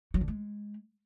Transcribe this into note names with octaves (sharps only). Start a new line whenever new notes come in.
F#3
D3
G#3